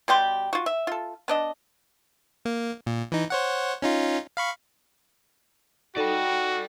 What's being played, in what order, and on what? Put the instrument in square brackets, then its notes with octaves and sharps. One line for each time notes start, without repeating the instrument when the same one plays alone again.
[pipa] B2 G3 G4 C6
F4 F#4
E5
F4 A4
B3 D4 D#5
[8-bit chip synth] A#3
A#2
E3 D#4
C5 C#5 F#5
C#4 D#4 F4
F5 B5 C#6
[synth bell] D#4 A4 [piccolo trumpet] F#4 [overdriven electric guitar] D5 G5